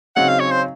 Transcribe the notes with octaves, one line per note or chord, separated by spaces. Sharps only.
C#3 F#3 C4 D#4 F#5
F5
C#5
C5